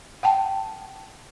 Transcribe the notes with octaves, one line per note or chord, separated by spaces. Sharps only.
F#5 G5 A5